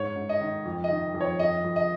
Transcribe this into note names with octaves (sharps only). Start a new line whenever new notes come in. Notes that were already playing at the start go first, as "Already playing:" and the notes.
Already playing: G#2 C#5
G#2
D#5
D#3
F2
D#5
D#3
F2
C#5
F2 D#5
F2
D#5